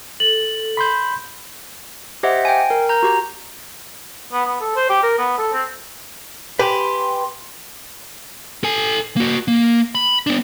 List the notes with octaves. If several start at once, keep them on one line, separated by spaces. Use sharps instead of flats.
A4 F#7
B5 C6 G6
G4 C5 D#5 E5 F#5
G5 G#5
A#4
A#5 G6
F#4 G4 A#5
B3
B3
A4
C5
G4
A#4
B3
A4
C4
G4 B4 G#5 B5 C6
A4 G#5
A#3 F#4
A#3
B5
B3 D4